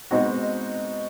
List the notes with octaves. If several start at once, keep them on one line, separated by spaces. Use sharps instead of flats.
B2 G#3 C4 D#4 F#4